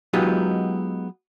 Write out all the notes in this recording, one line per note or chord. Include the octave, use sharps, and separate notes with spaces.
F#3 G#3 B3 D#4 F4 G4